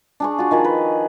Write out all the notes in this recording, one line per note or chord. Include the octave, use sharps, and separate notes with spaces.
D4 G#4 C#6
F4 F#4
D#3 F3 G#4
B4